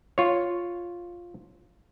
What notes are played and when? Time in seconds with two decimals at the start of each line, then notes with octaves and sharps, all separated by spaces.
0.18 F4 C#5